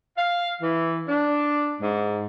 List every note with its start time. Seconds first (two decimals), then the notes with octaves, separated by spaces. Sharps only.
0.17 F5
0.61 E3
1.08 D4
1.80 G#2